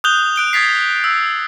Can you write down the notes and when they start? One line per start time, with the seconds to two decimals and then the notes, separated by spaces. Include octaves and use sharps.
0.04 D#6 F#6 G6 F7 G7
0.36 F#6 D7 G7
0.53 D#6 G#6 A6 B6 C7
1.04 E6